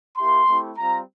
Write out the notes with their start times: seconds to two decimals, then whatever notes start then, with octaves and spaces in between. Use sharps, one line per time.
0.17 A#3 E4 G4 C6
0.47 A3 C4 E4 G4
0.77 G3 C4 F4 A#5